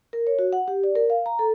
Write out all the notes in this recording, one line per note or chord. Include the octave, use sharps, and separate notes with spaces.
A#4
C#5
F#4
F#5
G4
D5
A#4
F5
A#5
A4